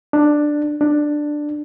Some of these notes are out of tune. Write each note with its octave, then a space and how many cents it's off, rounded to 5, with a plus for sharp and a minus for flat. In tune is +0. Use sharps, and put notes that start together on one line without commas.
D4 +10
D4 +10